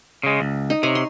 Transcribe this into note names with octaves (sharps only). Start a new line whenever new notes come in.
C#3 G#3
C#2
D#4
C3 C#5 G#5 A#5
C6